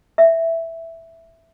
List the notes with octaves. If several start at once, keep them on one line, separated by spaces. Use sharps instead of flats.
E5